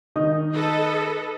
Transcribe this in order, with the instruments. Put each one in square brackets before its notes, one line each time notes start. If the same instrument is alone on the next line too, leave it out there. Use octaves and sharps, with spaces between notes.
[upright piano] D#3 D#4 D#6
[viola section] A4 B4 D#5